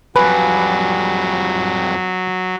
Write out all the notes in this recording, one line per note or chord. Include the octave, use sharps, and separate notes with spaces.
F2 F#3 G3 B4 G#5 B5 F#6